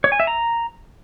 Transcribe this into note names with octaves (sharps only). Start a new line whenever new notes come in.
C#5
G#5
E5
A#5